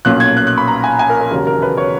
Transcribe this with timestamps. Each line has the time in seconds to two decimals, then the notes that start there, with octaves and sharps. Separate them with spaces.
0.05 B1 A#2 A#3 C#4 F#6
0.20 G#6
0.37 F#6
0.47 F#6
0.58 B5
0.68 A#5
0.84 G#5
0.99 G#5
1.09 A#4
1.21 A#4
1.31 E1 D#2 C#3 F#3 A#4
1.47 A#4
1.62 B4
1.77 C#5